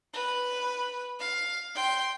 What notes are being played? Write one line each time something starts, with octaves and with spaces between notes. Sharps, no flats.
B4
F5
G5 C6